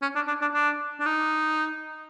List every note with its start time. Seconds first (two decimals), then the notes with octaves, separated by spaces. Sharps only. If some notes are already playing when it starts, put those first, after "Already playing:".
0.02 C#4
0.15 D4
0.28 D4
0.41 D4
0.53 D4
1.00 D4
1.06 D#4